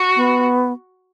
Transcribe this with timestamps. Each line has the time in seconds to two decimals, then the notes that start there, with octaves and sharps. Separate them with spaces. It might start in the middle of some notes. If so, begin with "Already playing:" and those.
Already playing: F#4
0.16 B3